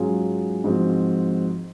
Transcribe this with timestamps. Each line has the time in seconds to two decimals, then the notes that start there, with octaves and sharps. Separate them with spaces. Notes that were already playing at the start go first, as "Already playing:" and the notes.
Already playing: G#2 F#3 C#4 F4 G#4
0.64 G#2 F3 C4 D#4 F#4